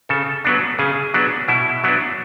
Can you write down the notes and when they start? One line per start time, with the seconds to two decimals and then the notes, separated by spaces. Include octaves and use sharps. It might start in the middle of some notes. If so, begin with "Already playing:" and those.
0.09 C#3 A4
0.44 F#3 B3 D4
0.79 C#3 G#4
1.14 F#3 B3 D4
1.48 B2 E4
1.84 F#3 B3 D4